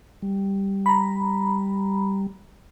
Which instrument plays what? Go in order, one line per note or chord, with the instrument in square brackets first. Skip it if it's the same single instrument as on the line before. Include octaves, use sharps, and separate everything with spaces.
[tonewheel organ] G3
[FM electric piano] A#5 B5